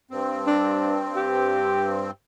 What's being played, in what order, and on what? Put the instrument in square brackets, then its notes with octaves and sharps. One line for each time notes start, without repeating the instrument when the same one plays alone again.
[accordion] G2 C4
[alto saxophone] D4
G4